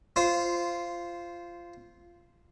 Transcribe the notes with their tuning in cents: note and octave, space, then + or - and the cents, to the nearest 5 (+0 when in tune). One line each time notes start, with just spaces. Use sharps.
F4 -15 C5 +0